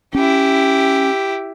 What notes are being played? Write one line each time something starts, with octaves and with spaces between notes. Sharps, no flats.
C#4 E4 G4